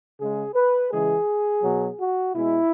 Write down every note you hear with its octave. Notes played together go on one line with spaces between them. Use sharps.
C#3 G#3 G#4
B4
C#3 E3 G#3 G#4
B2 F#3
F#4
B2 G#3 E4